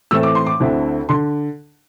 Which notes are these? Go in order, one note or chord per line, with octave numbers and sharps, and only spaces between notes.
A2 E3 A3 C4 E6
D6
C6
D6
D2 D3 C4 E4
D3 C6